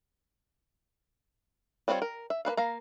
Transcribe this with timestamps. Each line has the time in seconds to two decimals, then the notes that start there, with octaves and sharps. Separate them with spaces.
1.88 G3 C4 D4 F4 C#5
2.02 A#4
2.30 E5
2.45 A#3 D4 B4 F5
2.57 A#3 F5 A#5